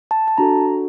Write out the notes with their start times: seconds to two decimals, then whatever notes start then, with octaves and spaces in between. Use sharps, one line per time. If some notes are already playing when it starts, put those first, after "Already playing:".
0.11 A5
0.28 A5
0.38 D4 F#4 A4 A#5